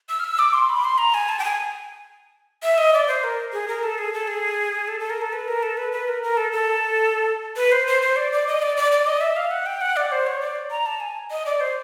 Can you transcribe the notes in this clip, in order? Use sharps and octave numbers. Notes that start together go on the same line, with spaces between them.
E6
F6
E6
D6
C6
B5
C6
A#5
G#5
A5
G5
G#5
E5
D#5
D5
C5
A#4
G#4
A#4
A4
G#4
A4
G#4
A4
A4
A#4
A4
B4
A#4
A4
B4
B4
A#4
A#4
A4
A4
B4
C5
C5
C5
D5
D5
D#5
D5
D5
D5
D#5
E5
F5
F#5
G5
F#5
D5
C5
C#5
D5
A#5
A5
G#5
D#5
D5
C5